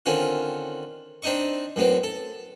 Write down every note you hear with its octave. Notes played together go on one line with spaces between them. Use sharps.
D3 D#3 C4 C#4 F4
C4 D4 D#4 D#5 C#6
F#2 A2 B3 C4
A4